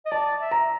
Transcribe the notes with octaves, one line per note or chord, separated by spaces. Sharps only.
D#5
D5 A5
E5
A#5